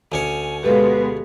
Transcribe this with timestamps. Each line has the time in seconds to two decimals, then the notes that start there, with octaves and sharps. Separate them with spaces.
0.12 D2 C#4 C#5 G#5
0.63 B2 G#3 B3 G4 A4 B4 F5